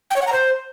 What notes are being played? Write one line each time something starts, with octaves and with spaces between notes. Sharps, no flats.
G5
C#5
F#5
A#5
C5